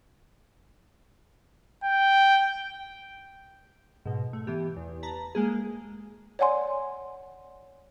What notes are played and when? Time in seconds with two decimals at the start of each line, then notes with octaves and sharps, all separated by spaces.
1.84 G5
4.06 G#2 B2
4.33 A3
4.47 E3 B3 G4
4.76 E2
5.03 B4 A5 A#5
5.35 G#3 A#3 G#4
6.39 C#5 D5 F#5 G#5 C6